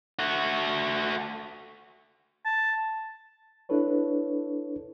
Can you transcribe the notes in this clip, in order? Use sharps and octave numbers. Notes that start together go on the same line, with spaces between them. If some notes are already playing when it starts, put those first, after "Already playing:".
A3 F#4
A5
D4 E4 A4 B4 C#5